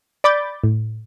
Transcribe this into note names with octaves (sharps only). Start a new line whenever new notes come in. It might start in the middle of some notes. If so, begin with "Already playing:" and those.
D5 B5 D6 G6 A6
A2